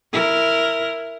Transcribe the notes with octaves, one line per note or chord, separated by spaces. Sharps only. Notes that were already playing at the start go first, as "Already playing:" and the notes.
E4 A#4